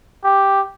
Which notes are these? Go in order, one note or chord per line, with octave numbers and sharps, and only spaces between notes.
G4